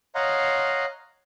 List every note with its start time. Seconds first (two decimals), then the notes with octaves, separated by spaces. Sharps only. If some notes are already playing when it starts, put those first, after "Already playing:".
0.15 C#5 D#5 F5 F#5 A#5 C6